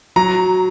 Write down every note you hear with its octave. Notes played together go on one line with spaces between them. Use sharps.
F#3 A#5